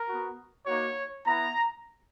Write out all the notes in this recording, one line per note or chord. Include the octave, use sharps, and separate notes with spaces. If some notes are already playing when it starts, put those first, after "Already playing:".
Already playing: A#4
B3 F#4
A#3 D#4 F#4 C#5
B3 E4 A#5